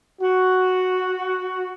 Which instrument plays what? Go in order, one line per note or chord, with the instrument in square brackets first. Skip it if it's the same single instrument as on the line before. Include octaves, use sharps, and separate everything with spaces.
[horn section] F#4